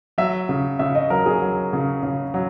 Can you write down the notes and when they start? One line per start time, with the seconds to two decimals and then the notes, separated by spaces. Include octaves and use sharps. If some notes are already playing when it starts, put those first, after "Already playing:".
0.18 F#3 E5
0.49 C#3
0.79 C#3 E5
0.95 D#5
1.10 F#3 A#4
1.26 G#4
1.42 F#3
1.73 C#3
2.03 C#3
2.34 F#3